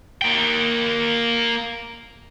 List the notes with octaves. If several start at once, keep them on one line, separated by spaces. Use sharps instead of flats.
A#3 G5